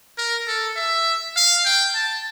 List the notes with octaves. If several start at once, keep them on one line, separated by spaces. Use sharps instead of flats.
A#4
A4
E5
F5
G5
A5